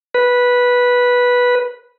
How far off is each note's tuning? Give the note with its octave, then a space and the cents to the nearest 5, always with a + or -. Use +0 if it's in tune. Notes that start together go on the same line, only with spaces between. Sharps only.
B4 -10